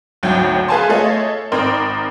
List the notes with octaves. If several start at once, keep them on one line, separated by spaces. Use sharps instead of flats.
G#1 D2 F#3 G5 G6
G#4 B4 F5 G#5 A5 C6
A3 F4 G#4 A4 C#5 D#5
G#1 C4 A#4 D5 C6 F6